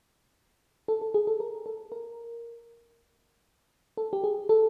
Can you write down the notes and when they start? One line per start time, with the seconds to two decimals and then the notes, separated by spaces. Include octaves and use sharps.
0.88 A4
1.01 A4
1.14 G#4
1.27 A4
1.40 A#4
1.66 A4
1.92 A#4
3.97 A4
4.13 G4
4.24 G#4
4.49 A4